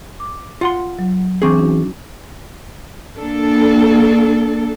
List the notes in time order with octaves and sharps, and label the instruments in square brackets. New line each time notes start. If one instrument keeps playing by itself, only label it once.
[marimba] D6
[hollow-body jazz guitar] F4 F#5 C6
[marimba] F#3
[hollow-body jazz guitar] E3 C4 G#4 [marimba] D4 C#6 D6
[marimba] C#4 D#4 F#4
[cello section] A#3 D4 A4